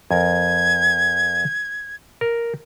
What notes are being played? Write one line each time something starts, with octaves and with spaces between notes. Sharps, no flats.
F2 A#4 G#6
A#4